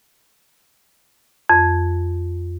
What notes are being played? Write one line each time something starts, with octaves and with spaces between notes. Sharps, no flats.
F2